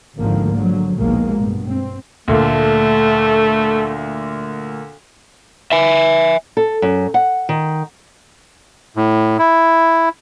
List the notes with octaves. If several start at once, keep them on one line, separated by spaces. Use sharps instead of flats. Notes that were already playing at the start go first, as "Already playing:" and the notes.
G#1 D2 D3 D#3 F3 A#3
D3 F3 F#3
A#1 D#2 B2 G#3 A#3
G2 B2
C4
D2 A#2 A3
E5 G#5
A4
F#2
F#5
D#3
A2
E4